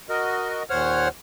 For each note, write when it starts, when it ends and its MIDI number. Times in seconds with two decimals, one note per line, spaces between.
0.09 0.63 66
0.09 0.63 70
0.09 0.63 75
0.70 1.08 39
0.70 1.08 46
0.70 1.08 72
0.70 1.08 73
0.70 1.08 78
0.70 1.08 89